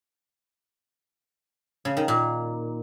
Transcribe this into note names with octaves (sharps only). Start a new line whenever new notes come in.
C#3
D#3
A#2